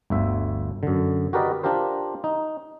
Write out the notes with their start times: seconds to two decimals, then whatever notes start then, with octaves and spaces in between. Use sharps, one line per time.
0.10 G1 D2 E5
0.83 F#2 D3
1.33 F#4 G4 A#4 B4 D5 D#5
1.63 D4 F4 G4 A#4 C5
2.24 D#4